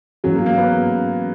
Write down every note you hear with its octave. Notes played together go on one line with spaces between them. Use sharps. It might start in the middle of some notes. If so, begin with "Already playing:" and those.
G#2 E3 F#3 G#3 C#4 G#4
A#3
A#3
B3